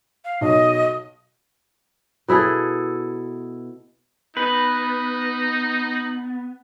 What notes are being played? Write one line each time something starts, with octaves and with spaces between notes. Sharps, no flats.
F5
B1 D#5
B2 E4 G#4 A4
B3 D#4 B4